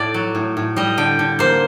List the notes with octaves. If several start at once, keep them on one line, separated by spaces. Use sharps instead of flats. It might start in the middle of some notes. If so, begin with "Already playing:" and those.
Already playing: A2 A4 D5
F#3
A2
A2
G3 D#5
D3 G5
D3
A#3 C5